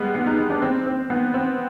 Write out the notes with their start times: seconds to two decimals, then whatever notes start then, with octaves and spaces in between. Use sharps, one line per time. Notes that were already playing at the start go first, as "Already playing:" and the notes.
Already playing: G3 G#3 B3
0.15 B3
0.26 D#4
0.38 D#4
0.50 D4
0.62 C4
0.86 C4
1.10 B3
1.34 C4